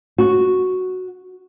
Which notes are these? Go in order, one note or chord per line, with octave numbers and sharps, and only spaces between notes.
F#4